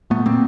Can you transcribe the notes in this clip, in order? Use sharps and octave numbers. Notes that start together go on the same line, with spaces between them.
A#2 A3 B3
A#2 A#3 C4